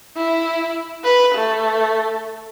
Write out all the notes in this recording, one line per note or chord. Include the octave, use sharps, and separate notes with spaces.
E4
B4
A3